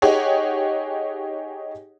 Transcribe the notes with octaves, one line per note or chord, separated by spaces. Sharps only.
D#4 G4 G#4 C#5 F#5